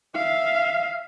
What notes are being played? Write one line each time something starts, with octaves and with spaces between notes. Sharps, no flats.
E5 F5